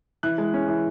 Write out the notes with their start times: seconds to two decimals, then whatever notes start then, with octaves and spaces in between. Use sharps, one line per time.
0.23 E3 F#6
0.38 G#3
0.54 C#4
0.68 E3